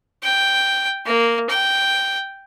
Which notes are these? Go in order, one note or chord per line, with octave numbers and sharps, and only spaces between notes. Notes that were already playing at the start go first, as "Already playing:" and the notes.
G5
A#3
G5